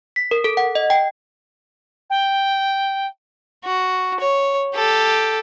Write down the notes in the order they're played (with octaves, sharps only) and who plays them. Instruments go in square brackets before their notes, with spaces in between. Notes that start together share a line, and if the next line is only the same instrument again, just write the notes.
[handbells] B6
A#4
A4
F#5
D#5
G5
[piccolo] G5
[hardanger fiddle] F#4
C#5
G4 A4